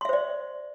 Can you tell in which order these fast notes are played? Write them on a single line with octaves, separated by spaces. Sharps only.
C6 E5 C5 D5